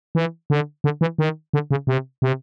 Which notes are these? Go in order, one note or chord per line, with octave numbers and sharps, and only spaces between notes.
E3
D3
D3
E3
D#3
D3
C#3
C3
C3